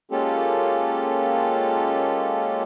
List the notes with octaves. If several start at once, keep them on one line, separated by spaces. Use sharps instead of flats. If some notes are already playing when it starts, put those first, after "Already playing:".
G#3 A#3 C#4 F4 G4 A4